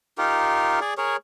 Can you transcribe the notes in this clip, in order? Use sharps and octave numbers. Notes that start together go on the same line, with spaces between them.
D#4 F4 G4 A#4
G#4 D5
G#4 A#4 C#5